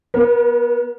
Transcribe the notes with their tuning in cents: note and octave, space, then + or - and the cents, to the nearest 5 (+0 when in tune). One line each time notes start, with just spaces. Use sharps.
B3 -25 A#4 +30